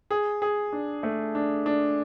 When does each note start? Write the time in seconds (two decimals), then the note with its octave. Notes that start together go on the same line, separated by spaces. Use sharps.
0.11 G#4
0.42 G#4
0.73 D4
1.03 A3
1.35 D4
1.66 D4